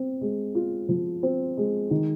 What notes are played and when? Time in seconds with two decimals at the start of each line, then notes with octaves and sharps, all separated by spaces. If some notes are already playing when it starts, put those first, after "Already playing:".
Already playing: C4
0.21 G#3
0.55 F4
0.89 F3
1.23 C4
1.57 G#3
1.91 D#3